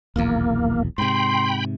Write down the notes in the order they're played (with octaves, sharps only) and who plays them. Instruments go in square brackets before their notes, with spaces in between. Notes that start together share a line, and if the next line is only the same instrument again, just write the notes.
[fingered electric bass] D#1 B1 E2 [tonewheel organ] A#3
[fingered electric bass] G#2 C3 [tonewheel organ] G5 B5 [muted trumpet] C6